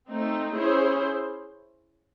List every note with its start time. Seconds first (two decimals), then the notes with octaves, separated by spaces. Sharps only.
0.09 A3 C4 D#4
0.55 C#4 E4 G#4 C5